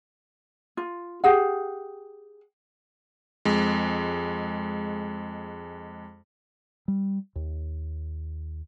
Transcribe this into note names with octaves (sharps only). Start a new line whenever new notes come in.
F4
G4 G#4 F#5
F2 G#3
G3
D#2